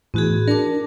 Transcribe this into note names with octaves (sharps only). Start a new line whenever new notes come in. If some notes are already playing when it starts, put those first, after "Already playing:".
A2 E3 B3 F#4 G#4
D4 A#4 A5 D6